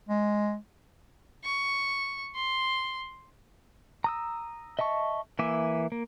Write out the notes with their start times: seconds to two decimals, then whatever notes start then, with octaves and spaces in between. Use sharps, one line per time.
0.09 G#3
1.44 C#6
2.35 C6
4.04 A#5 D#6 E6
4.79 D#5 E5 A5 C#6
5.39 E3 A#3 E5 G#5 D6
5.92 A#3